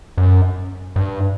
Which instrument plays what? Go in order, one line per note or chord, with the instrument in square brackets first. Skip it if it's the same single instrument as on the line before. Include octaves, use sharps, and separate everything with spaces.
[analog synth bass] F#2
G2